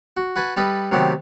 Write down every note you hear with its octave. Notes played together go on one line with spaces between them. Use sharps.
F#4
F#4 B4 G#5 A5
G3 A4 B4 D#5
C3 D#3 F#3 A3 B3 G4